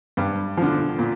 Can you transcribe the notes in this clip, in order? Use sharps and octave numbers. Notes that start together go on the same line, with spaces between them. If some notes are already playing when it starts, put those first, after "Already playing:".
G2
D3 F3
A#2